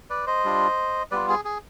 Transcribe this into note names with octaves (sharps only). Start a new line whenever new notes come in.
B4 D5
C5 D#5
G3 D4 F4
G3 B3 F4 B4 D5
G#4
G#4